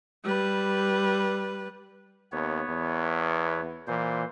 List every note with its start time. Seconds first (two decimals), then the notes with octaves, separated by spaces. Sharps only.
0.24 G3 B4
2.32 D#2 B3 C#5
2.68 E2
3.88 A#2 E3 C5